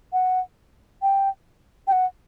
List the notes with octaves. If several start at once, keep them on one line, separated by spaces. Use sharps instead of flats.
F#5
G5
G5
F#5